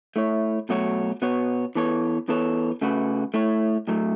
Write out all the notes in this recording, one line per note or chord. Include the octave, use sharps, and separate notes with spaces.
A3 E4 C#5
B2 F#3 A3 F#4 C#5
B2 B3 F#4 C#5
E3 B3 A4 C#5
E3 B3 A4 C#5
C#3 A3 F#4 B4
A3 E4 C#5
A2 F#3 A3